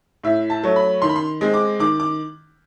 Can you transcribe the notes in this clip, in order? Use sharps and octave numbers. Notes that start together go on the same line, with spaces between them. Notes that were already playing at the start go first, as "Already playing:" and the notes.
A2 E5
A5
F#3 A3
B5
D#3 C6
B5
C6
G#3 C4
D6
D#3 D6
D6